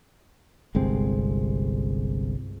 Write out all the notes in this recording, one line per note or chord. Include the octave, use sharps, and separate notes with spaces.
G1 C2 G#3 C4